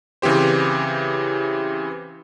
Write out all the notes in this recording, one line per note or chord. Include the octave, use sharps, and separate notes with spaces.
C#3 E3 C4 G4 C5